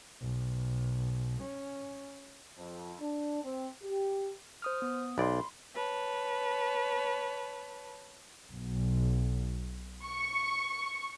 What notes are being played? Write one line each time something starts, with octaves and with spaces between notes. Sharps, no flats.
B1
C#4
F2
D4
C4
G4
C5 D#6 F6
B3 D#6
B1 D5 B5 C6
B4 C#5 A5
B1
C#6